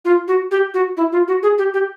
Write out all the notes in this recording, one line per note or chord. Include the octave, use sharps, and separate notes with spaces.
F4
F#4
G4
F#4
E4
F4
F#4
G#4
G4
G4